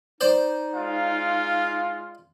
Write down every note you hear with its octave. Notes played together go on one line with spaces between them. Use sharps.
D#4 C5 D5
G#3 F4 F5